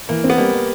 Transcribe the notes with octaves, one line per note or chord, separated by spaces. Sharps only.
E3 A#3
C4
B3
G3 A#3
G3